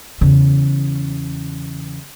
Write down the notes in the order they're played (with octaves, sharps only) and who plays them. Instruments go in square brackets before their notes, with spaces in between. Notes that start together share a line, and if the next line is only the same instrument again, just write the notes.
[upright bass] E2 C#3